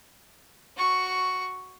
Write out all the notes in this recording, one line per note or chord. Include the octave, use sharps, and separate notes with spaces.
F#4 C#6